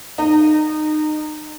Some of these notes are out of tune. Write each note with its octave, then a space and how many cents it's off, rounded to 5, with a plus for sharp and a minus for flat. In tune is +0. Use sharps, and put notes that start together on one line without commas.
D#4 -25